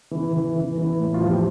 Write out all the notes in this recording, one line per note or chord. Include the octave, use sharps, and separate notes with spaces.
E3
E3
E3
E3
A2
F4
F3
G4